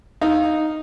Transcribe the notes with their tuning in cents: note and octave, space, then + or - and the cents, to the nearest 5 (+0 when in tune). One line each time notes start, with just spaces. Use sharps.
D#4 +0 F5 +0